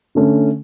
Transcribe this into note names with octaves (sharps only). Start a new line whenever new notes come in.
D3 A3 C#4